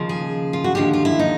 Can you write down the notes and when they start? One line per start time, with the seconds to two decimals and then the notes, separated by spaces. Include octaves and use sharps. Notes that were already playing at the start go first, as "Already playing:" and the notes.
Already playing: D#2 C#3 F3
0.09 G#4
0.53 F4
0.64 F#4
0.75 D#2 D3 F3 G4
0.93 F4
1.05 E4
1.19 D#4